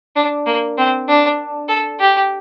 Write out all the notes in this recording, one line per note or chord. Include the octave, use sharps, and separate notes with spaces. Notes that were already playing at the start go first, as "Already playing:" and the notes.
D4
A#3
C4
D4
A4
G4